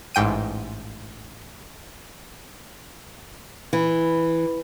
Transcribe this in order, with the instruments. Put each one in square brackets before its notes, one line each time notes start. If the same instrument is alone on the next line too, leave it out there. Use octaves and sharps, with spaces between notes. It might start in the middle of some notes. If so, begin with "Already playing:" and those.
[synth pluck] A1 G#2 G5 D#7
[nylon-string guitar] E3